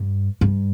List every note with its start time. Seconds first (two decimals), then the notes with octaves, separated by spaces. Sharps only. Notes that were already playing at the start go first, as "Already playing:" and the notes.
Already playing: G2
0.41 G2